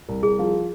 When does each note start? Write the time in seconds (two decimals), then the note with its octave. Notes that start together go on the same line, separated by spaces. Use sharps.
0.09 C2
0.23 C2 G#4
0.39 F3